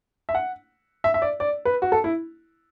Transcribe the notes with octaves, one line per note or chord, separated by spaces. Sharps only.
E5
F#5
E5
E5
D5
D5
B4
F#4
A4
E4